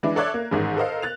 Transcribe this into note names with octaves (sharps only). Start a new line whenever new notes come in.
E3 G#3 D4 E4
A4 C#5 D5 E5 F#6 G#6
A#3
A1 G#2 D#3
A4 A#4 C5 D#5 F5
F#6 A6 F7